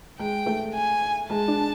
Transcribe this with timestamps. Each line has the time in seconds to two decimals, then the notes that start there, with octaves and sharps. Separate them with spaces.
0.19 G#3 G5
0.46 A3
0.74 G#5
1.30 G#3 A5
1.48 D4